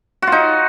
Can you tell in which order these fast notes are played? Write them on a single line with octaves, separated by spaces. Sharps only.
F#4 F4 D#4